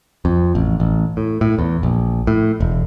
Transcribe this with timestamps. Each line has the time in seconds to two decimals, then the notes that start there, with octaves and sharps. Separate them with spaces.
0.25 F2
0.55 A1
0.80 A1
1.17 A2
1.41 A2
1.59 E2
1.83 A#1
2.27 A2
2.60 E1